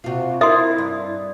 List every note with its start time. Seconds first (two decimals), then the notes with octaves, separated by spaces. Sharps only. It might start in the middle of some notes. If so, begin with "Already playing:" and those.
0.04 C3 F4 F#4
0.41 E4 A#4 D#5 E5 C6 D#6
0.78 G2